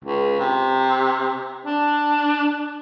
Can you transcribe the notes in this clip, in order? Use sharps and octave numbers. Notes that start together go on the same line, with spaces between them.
C#2
C3
D4